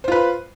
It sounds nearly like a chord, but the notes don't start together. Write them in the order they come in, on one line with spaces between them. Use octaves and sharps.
C5 F4 B4